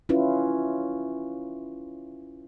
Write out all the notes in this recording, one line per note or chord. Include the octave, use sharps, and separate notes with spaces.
C#4 E4 F4 B4